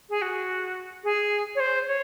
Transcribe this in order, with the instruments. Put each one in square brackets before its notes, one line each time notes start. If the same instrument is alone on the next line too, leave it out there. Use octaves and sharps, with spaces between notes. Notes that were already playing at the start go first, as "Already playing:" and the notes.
[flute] G#4
F#4
G#4
C#5
C5
C#5